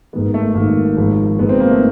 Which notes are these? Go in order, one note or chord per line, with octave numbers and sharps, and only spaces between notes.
G#1 G#2 D#3 B3
A3
G#1 G#2 D#3 A#3
G#1 G#2 F3
G#1 G#2 F3 B3
C4
A#3
A3